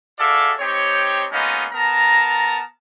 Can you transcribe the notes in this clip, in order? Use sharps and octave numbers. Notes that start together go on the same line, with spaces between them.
F#4 G#4 A4 D5 E5 F5
C4 D#4 G4 C#5
G#3 A#3 B3 C#4 D#4 F4
B3 A#4 A5 A#5